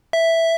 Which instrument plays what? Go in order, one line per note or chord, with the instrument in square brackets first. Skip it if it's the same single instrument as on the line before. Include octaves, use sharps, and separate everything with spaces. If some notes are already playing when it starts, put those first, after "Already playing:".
[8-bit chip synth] E5